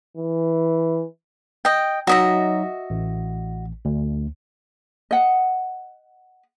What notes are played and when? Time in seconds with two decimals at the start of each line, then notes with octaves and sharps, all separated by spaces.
0.17 E3
1.65 D#5 G5
2.07 F#3 D#4 F#4 D#5 E5
2.90 A1
3.85 D2
5.11 D#5 F#5